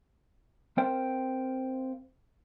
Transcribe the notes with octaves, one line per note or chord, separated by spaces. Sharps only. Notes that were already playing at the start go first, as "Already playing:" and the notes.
C4 A#4 C5 F5 G5